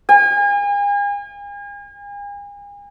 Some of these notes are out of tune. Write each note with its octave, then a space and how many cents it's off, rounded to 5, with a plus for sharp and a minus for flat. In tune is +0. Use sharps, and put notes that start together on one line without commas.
G#5 -40